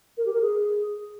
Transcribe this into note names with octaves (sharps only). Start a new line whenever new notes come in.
A#4
G4
A#4
G#4